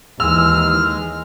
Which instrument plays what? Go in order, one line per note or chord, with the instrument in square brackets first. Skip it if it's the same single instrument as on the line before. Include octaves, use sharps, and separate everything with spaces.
[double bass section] D#2 E3 [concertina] G#3 [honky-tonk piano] E6 [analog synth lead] F6